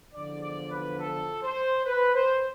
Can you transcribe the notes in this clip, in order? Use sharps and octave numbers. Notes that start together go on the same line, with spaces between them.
E2 D3 F3 D5
D5
B4
A4
C5
B4
C5